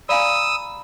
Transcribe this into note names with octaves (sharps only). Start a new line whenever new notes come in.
D5 F5 G#5 A#5 B5 D#6 E6